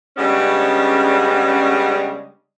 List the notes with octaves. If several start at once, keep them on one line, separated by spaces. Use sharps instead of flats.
C#3 G3 G#3 B3 C#4 D4